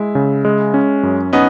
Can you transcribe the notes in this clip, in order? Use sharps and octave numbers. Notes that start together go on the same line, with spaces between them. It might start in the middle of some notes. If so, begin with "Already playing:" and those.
Already playing: G#3 E4
C#3
G#3
C#4
F#2
B3 C#4 D#4